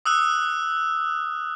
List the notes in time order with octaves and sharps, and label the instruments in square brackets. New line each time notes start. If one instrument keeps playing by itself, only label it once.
[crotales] D#6 E6 F#6